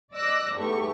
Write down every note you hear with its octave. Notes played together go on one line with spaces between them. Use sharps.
D5 D#5 D6 E6 F#6 A#6
E2 G#2 A3 G4 C#6